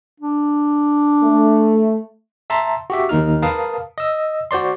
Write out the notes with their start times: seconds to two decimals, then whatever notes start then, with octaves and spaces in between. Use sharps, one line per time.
0.20 D4
1.23 A3
2.50 E5 A5 A#5 C6
2.90 F#4 G4 E5
3.09 D#2 D#3 A#3 D#4 F6
3.42 A#4 B4 F5 A5 D#6
3.98 D#5 E6
4.51 F#4 C5 D5 C6